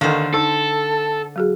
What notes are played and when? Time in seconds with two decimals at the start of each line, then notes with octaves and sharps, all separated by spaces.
0.01 D#2 D3 D#3 C5
0.34 D#4 A4 E6
1.36 F#3 F#4 G#4